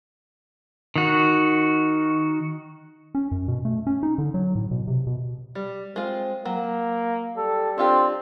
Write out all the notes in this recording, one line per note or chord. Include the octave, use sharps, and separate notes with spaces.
D#3 F#4
C#4
F#2
B2
A3
C#4
D#4
D3
F#3
A2
B2
C3
B2
G3
G#3 C4 F4
F#3 A#3
G3 A4
C4 D4 F4 G4